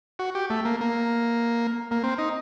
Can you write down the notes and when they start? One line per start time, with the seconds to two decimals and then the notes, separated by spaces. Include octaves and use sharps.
0.19 F#4
0.35 G4
0.50 A3
0.65 A#3
0.81 A#3
1.91 A#3
2.03 C4
2.18 D#4